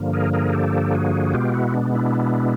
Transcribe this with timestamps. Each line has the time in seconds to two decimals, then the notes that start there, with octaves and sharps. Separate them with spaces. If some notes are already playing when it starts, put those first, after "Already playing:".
Already playing: G2 D3 F3 A#3
0.13 G#4 A#4
0.33 G#4 A#4
0.53 G4 A4
0.94 F#4 G#4
1.33 B2 G#3 B3 F4 G4
1.54 E4 F#4
1.74 D4
1.94 D4 E4